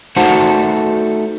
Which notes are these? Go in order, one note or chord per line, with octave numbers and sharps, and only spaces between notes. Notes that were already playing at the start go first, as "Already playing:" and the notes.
A3 D#4 F#4 A4 C5 F#5